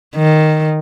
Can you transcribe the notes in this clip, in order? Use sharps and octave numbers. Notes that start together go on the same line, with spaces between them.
D#3